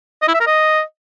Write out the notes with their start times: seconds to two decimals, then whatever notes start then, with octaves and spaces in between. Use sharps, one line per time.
0.22 D#5
0.28 E4
0.34 E5
0.40 A#4
0.46 D#5